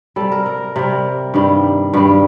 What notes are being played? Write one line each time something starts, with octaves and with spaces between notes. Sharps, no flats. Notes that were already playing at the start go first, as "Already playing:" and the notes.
C3 G3 A4
A#4
A#4
C3 G3 A#4
G2 D#3 G3
G2 D#3 G3